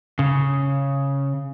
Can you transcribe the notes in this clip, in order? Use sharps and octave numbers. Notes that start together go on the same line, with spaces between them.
C#3